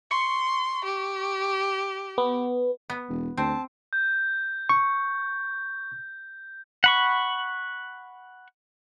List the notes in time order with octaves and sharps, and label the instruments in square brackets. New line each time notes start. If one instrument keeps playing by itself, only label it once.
[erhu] C6 [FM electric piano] C#6
[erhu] G4
[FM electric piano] B3
[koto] B3
[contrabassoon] E1
[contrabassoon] D2 [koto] C4 [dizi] A5
[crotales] G6
[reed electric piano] C#6
[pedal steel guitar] F#5 B5 C#6